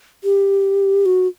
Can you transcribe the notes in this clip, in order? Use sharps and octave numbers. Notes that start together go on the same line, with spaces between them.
G4
F#4